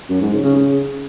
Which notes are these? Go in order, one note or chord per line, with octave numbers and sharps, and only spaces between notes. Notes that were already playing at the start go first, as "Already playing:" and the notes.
F#2
G#2
C#3
C#3
C#3